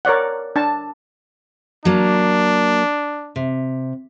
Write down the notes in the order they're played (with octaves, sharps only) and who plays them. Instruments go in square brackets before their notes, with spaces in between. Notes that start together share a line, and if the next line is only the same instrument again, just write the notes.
[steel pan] A#4 C#5 D5 F#5
D4 A5
[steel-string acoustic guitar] F#3 A#3 [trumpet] D4
[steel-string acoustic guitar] C3